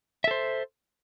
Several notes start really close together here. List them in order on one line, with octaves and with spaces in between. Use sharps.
E5 A4 C5